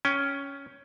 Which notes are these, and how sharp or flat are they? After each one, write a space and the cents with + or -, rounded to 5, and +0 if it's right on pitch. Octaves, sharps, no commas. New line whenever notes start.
C#4 +10 G5 +5